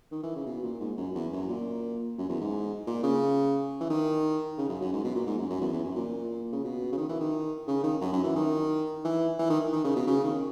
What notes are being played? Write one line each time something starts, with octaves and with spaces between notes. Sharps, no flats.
D#3
E3
C#3
B2
A#2
G#2
F#2
E2
F#2
A#2
F#2
E2
G#2
A#2
C#3
E3
D#3
C#3
F#2
F#2
G#2
B2
A#2
G#2
F#2
F#2
E2
E2
F#2
A#2
C#3
B2
C#3
D#3
E3
D#3
C#3
D#3
F#2
F#2
E3
D#3
E3
E3
D#3
D#3
C#3
B2
C#3
D#3